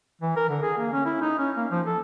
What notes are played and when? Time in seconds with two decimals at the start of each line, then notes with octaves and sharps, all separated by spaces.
0.21 E3
0.36 A#4
0.49 D3
0.63 G#4
0.77 A#3
0.93 C#4
1.06 E4
1.21 D#4
1.38 C#4
1.56 A#3
1.71 F3
1.86 A4